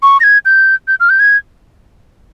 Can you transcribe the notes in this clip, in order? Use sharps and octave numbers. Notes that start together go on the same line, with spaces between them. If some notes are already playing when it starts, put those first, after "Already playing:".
C#6
A#6
G#6
G6
G6
F6
G6
G#6